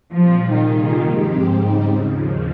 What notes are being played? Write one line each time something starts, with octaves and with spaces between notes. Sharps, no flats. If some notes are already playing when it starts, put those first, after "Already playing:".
A#2 F3 G3 C4 F4
C3 D#3 G3 A#3 F4 G#4
G2 F3 G#3 C4 G4
G#2 C#3 G3 C4 D#4
D#2 C#3 F3